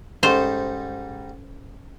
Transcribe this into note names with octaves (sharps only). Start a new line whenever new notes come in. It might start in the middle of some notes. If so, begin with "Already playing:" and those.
G#2 G3 C#4 D#4 A4 C5